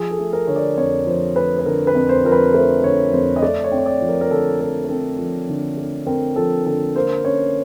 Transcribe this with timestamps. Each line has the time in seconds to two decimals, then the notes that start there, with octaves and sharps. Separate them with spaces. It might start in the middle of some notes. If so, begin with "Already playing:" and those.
Already playing: F3 G#4
0.11 A4
0.19 A3
0.33 A#4
0.47 D3 C#5
0.56 D5
0.77 F2 C#5
1.06 F3 C5
1.36 A3 B4
1.59 B4
1.66 D3 A#4
1.87 B4
1.95 F2
2.09 C5
2.24 F3 A#4
2.32 B4
2.54 A3 C5
2.83 D3 C#5
3.12 F2 C5
3.36 D#5
3.42 A3 D5
3.64 C#5
3.71 C4
3.78 C#5
3.86 D5
4.01 F3
4.09 A#4
4.21 A#4
4.31 D3 A4
4.60 A3 A4
4.84 A#4
4.89 C4 A4
5.18 F3
5.49 D3
5.77 A3
6.06 C4 A#4
6.36 F3 A4
6.66 D3 A4
6.96 A#3 C5
7.24 C#4 C#5